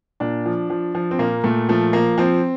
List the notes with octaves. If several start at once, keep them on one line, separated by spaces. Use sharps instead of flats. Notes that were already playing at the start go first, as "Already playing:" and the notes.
A#2 D4
F3
F3
F3
C4
A#2 A#3
A#2 A3
F3 A3
F3 A#3
F3 C4